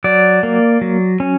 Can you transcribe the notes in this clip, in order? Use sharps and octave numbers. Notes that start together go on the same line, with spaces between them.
F#3 D5
A#3
F#3
C#4